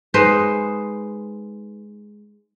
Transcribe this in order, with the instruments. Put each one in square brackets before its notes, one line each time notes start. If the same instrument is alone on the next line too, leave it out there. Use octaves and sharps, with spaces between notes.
[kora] G#3 D#4 B4 C5